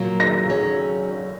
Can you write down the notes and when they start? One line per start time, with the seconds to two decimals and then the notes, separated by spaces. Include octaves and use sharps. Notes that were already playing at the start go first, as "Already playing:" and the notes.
Already playing: A#2 F#3 A#3
0.20 A#6
0.49 F#3 C#4 G#4 C#5